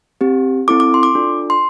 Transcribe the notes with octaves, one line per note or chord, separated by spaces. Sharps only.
C4 G4
C4 E4 A4 D6
D6
C6
D6
D4 F4 A4
C6